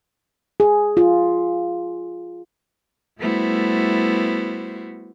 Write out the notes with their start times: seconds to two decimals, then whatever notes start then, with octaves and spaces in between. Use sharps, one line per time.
0.60 G#4
0.97 F4
3.18 G3 A3 B3 E4 F#4 C5